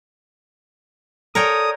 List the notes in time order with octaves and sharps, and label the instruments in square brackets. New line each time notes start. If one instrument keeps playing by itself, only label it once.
[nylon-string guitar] A4 D5 [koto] A#4 C#5 G5 [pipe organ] D#6